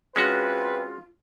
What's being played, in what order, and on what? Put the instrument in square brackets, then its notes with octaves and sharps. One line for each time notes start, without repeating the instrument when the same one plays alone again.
[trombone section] E2 C4 B4 [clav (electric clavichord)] G#3 C#4 F#4 [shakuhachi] F4